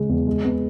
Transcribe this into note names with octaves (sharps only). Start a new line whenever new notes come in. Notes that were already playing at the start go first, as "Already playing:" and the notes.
Already playing: C#3 G#3
E2
G#3
B3